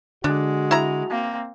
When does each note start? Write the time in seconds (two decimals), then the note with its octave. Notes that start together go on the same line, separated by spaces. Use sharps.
0.24 D3 G#3 D4 F#4
0.71 E4 A#5
1.10 A#3 C4